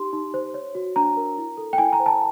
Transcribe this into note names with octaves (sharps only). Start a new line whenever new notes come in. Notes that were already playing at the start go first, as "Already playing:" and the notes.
Already playing: D#4 G4 C6
D#4
C5
C#5
F#4
D4 A#5
A#4
E4
A4
G5
E4 G#5
A#5
C5
A5